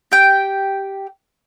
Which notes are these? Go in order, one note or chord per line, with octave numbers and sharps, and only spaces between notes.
G4 G5